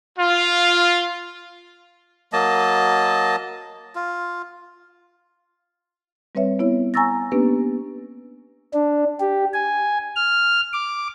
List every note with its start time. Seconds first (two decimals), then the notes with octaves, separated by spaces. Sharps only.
0.18 F4
2.33 F#3 A#3 D#5 A5
3.95 F4
6.35 G3 C4 B4 C#5 E5
6.59 B3 E4 C#5
6.94 G#5 A#5 C#6 E6 A6 A#6
7.32 A#3 B3 C#4 D4 G4 B4
8.73 D4
9.20 G4
9.54 G#5
10.16 F6
10.73 D6